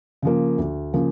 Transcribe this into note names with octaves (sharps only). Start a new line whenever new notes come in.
C#3 F3 A#3
D2
C#3 F3 A#3